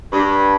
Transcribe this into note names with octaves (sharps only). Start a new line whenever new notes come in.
G2